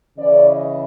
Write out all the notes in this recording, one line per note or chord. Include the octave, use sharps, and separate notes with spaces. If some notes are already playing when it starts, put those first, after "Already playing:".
C#3 E3 D5
D#5